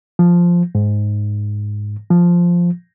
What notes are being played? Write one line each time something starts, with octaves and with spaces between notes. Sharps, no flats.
F3
G#2
F3